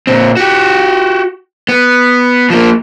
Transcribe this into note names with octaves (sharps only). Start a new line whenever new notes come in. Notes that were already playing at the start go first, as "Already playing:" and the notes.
A#2 C4
F#4 G4
B3
F3 A#3